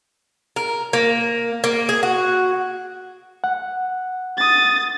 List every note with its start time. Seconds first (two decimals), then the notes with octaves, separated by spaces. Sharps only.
0.56 A#4
0.93 A#3
1.64 A#3
1.89 G#4
2.03 F#4
3.44 F#5
4.38 D#6 A6